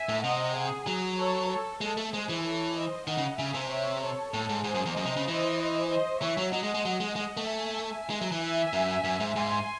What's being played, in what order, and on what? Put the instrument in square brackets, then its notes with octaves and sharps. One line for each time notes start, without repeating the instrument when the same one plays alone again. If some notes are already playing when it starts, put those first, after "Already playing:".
Already playing: [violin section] E5 G#5
[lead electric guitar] A2
[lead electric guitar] C3 [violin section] D#5 F#5
[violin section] G#4
[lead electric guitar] F#3
[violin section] A4 C#5
A4
[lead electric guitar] G#3 [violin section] A4
[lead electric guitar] A3
[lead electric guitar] G#3 [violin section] G#4 C5
[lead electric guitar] E3
[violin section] A4 C#5
C5 D#5
[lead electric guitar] D#3 [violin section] D#5 F#5
[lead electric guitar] C#3
[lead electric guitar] C#3 [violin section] E5 G#5
[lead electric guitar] C3
[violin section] C#5 E5
A4 C#5
[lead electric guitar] A2 [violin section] A4
[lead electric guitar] G#2
[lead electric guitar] G#2 [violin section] G#4 C5
[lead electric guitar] F#2
E2
[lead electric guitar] F#2 [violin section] C5 D#5
[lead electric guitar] C3
C#3
[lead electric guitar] E3 [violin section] C5 D#5
[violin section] C5 D#5
[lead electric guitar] E3 [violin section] C#5 E5
[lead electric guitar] F#3
[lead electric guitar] F#3 [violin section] D#5 F#5
[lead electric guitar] G#3
G#3
F#3
G#3
[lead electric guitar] G#3 [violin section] D#5 F#5
[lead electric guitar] A3
[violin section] E5 G#5
[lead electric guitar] G#3
F#3
E3
[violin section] E5 G#5
[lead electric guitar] F#2
F#2
G#2
[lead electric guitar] G#2 [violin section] G#5 C6